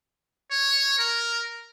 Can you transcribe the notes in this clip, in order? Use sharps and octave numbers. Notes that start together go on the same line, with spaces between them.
C#5
A#4